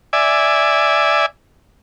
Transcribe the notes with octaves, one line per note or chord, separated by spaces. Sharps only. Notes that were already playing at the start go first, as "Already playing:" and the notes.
D5 E5 G#5